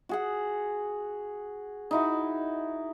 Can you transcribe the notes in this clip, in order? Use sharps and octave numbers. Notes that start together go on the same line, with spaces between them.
F#4 G#4 F#5
D#4 E4 F#4